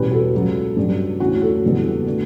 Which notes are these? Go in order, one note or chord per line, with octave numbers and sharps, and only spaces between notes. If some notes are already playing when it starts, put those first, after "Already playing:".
Already playing: E2 B2 G3 C#4 G4 B4
F#4 A4
C#2 C#3 F#3
G2 F#3 C#4
E2 D3 A3 C#4 F#4
F#4 A4
F#1 E2 D3 G3 B3
D3 A3 D4